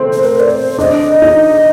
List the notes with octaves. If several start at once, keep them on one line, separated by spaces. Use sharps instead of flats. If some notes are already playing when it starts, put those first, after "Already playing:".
Already playing: A3 C4
C5
A#4
D5
C5
D4 D#5
D#4